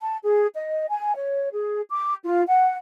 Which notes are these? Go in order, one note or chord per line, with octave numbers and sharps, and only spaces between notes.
A5
G#4
D#5
G#5
C#5
G#4
D6
F4
F#5